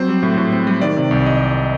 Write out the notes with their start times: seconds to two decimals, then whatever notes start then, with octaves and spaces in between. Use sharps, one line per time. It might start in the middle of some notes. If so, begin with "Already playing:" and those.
Already playing: F#3 C4 C5
0.08 G3
0.23 A2
0.38 A2
0.52 C4
0.67 G3
0.82 D#3 D5
0.97 C3
1.11 C2
1.26 D#5